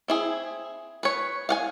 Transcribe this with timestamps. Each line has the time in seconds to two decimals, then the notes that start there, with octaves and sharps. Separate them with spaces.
0.08 C4 E4 G#4
1.03 B4 C#5
1.49 F5 F#5 G#5